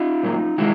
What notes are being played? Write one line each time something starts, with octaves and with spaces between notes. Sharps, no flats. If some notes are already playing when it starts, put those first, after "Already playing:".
Already playing: D#4 F4
A#2 F#3 A#3
C3 D#3 G#3 E4 F#4